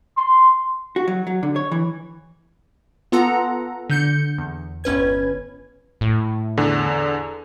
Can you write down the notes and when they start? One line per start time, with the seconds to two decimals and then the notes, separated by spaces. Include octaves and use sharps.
0.18 C6
0.96 F#4
1.08 F#3
1.27 F#3
1.43 D3
1.56 C#5
1.72 E3
3.12 B3 F4 A4 F#5 A#5
3.90 D3 G6 C#7
4.38 E2
4.84 G1 C#4 B4 G#6
6.01 A2
6.57 E2 D3